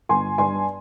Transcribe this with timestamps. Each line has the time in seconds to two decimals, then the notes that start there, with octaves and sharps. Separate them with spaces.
0.09 G1 G#5 C6
0.38 G2 G#5 C6